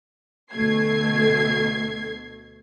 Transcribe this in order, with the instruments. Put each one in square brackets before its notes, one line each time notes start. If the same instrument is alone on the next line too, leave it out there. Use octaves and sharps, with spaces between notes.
[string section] D2 B2 A3 G#6 C7